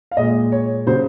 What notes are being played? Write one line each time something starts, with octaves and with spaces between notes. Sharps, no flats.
F5
A#2 G#3 D#5
C#5
C#3 F#3 C5